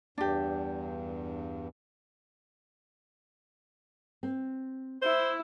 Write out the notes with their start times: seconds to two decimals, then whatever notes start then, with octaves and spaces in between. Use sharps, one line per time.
0.18 E2 G2 D4 G4
4.23 C4
5.02 E4 C5